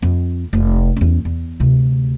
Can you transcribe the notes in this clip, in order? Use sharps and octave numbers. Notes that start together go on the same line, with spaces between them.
F2 C4
F1
E2 C#4
E2
D2 C3